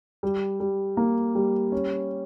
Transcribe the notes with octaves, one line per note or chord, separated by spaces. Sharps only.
G3
G3
A#3
G3
C#4